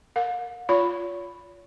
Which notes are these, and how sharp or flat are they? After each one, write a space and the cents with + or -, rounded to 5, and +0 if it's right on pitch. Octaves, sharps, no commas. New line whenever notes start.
A#4 +0 F5 +45
F4 +0 C#5 +40 B5 +0